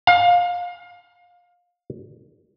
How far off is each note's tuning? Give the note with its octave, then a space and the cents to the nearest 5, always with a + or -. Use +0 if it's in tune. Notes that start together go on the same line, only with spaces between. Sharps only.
F5 +25